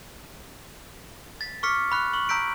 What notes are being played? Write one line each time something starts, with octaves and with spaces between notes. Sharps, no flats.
A6 B6
C#6 D6 F6 B6 C#7
B5 C#6 F#6 C#7
C#6 F#7
A#5 E6 G6 B6 D7